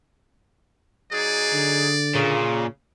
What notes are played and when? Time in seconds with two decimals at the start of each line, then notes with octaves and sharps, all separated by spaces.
1.12 F#3 D#4 G#4 D5
1.53 D3
2.15 A#2 C#3